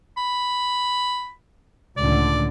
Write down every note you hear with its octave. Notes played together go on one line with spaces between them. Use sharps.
B5
C#2 A2 D3 D5